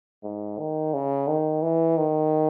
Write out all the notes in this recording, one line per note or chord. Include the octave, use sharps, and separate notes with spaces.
G#2
D#3
C#3
D#3
E3
D#3